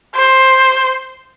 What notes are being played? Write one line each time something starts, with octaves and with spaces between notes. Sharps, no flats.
C5